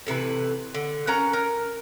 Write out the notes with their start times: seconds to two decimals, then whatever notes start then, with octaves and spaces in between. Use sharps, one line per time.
0.07 A2 C3 E3 B4
0.75 D3
1.07 C#4 A#4 F#5 A#5
1.33 A#4